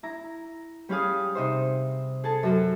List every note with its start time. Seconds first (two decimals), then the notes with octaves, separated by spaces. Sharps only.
0.03 E4 A#5
0.89 G3 C#4 G#4 F5 D#6
1.35 C3 D#4 C5
2.24 G#4 A4 A5
2.43 F#2 F#4 A4